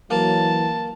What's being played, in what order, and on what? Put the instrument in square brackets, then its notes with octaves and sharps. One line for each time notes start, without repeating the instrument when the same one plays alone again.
[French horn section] E3 F#3 [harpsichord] A#3 [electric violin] A5